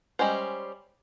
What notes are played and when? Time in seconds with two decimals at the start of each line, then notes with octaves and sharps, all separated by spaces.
0.19 G3 G#3 C#4 C5